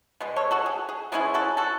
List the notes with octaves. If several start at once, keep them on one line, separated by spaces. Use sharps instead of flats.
B2 G#3
A4 C#5
F#4 A4
G#4
G#4
B2 G#3 C#4 E4 G#4
F#4 A4
F#4 A4